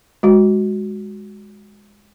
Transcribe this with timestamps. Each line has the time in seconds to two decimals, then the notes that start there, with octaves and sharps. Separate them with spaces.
0.23 G#3 F#4